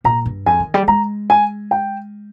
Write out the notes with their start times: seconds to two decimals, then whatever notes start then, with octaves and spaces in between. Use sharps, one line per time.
0.04 A#2 A#5
0.26 G2
0.46 F2 G#5
0.60 D#3
0.74 G3
0.87 G#3 A#5
1.30 G#5
1.71 G5